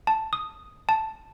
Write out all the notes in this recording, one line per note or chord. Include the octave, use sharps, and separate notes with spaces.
A5
D#6
A5